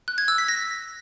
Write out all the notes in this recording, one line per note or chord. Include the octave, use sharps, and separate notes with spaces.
F#6
G#6
E6
B6
A#6